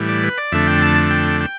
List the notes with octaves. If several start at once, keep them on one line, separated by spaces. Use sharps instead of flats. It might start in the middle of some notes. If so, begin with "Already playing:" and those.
Already playing: A2 E3 G3
D5
B4
D5
F2 D3 A3 D4 E5
G5
A5
G5
G5